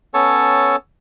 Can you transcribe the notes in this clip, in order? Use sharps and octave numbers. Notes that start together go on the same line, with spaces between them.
B3 C#4 A4 C#5 A5